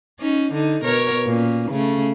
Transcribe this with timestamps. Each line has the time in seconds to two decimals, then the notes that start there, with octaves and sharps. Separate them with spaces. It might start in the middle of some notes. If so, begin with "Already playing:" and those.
0.20 C#4 D#4
0.53 D3 D#4
0.84 B2 A#4 C#5
1.26 A#2 C#4
1.71 C#3 A3